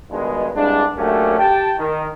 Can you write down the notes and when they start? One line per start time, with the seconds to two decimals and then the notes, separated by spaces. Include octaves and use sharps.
0.10 G2 B2 D#3 G#3
0.55 C2 G2 G#3 D4
0.96 F#3 A3 A#3 C#4 D4 G4
1.39 G4 G5 A5
1.78 D#3